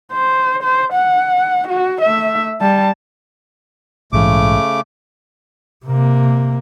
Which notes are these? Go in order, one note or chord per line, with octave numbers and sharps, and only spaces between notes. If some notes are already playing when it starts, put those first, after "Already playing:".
C5
C5
F#5
F#4
A3 E5
G3 A5
A#1 G#2 C#3 E3 A3 D6
C3 A#3